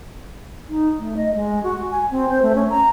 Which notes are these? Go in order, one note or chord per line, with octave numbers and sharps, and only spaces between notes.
D#4
A3
D#5
G#3
F#4
G#5
C4
C5
A3
C#4
A#5